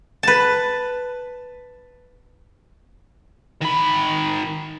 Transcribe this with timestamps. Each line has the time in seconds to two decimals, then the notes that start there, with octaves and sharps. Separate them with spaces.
0.23 B4 A5
3.61 D#3 B5